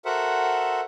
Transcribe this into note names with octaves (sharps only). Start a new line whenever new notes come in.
F#4 A4 A#4 C5 E5 F#5